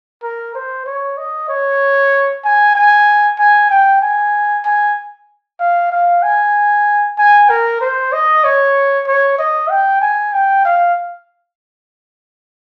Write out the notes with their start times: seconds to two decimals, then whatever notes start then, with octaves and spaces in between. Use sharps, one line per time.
0.23 A#4
0.55 C5
0.86 C#5
1.18 D#5
1.49 C#5
2.44 G#5
2.75 G#5
3.39 G#5
3.70 G5
4.02 G#5
4.65 G#5
5.60 F5
5.92 F5
6.23 G#5
7.18 G#5
7.50 A#4
7.81 C5
8.13 D#5
8.44 C#5
9.07 C#5
9.39 D#5
9.70 G5
10.01 G#5
10.33 G5
10.65 F5